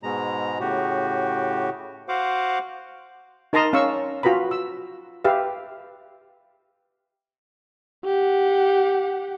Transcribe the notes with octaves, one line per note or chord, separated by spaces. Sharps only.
G#2 B2 G#3 A#5
A2 C#3 F#4 G4
F#4 C5 F5 F#5 D6
D#4 A#4 A5 A#5 C6 D#6
C#4 F5 C#6 E6
F4 F#4 B4 A#5 B5
E6
G4 B4 E5 F5
G4 F#5